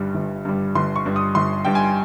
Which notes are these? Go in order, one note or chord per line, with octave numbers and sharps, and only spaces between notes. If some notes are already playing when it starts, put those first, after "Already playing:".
Already playing: G1 G2 G3
G1
G2 G3
G1 C6
C#6
G2 G3
D#6
G1 C6
G2 G3 G5
G#5